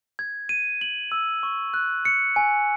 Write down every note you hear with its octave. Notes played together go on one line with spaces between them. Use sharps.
G#6
D#7
F#7
E6
C#6
F#6
C#7
G#5